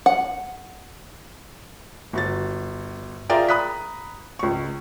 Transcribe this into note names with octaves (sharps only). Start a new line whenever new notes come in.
F#5
G1 F#4 A6
F4 G#4 A#4 D5 E5 G5
A#5 B5 D#6 F#6 B6
C#2 C#6